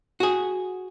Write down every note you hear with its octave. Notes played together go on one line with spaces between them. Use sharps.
F#4 G#4